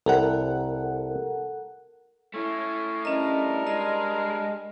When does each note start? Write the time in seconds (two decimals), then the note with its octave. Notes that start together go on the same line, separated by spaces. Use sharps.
0.06 C2 A4 A#4 F#5
2.34 A3 C#4 E4
3.05 G3 C#4 D4 A#4 D#5
3.67 G#3 D#5